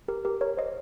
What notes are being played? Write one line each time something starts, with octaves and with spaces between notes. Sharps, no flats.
G4 A#4
G4 A#4
A#4 C#5
C5 D#5